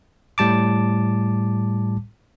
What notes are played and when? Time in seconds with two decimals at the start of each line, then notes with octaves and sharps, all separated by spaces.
0.38 A2 G3 A5 D6